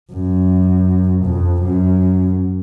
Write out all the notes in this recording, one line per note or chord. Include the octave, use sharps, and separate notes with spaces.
F#2
F2
F#2